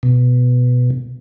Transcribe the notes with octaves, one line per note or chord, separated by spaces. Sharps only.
B2